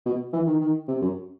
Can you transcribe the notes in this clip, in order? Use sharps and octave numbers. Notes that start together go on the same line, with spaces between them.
B2
E3
D#3
D#3
C3
F#2